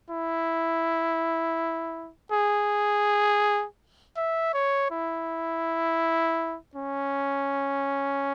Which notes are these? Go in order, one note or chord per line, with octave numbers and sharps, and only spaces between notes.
E4
G#4
E5
C#5
E4
C#4